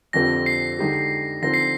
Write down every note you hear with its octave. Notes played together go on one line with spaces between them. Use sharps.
F2 D3 F3 C4 G4 A#6
C7
D3 G#3 D#4 G4
D3 F3 C4 D#4 A#6
C7